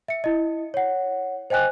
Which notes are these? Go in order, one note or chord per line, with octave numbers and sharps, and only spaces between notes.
E5 C#7
E4 D#5
C#5 F#5
C5 D#5 G5 G#5 F#6